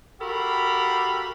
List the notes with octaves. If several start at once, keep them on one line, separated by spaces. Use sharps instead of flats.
F#4 G4 A4 A#4 F5 B5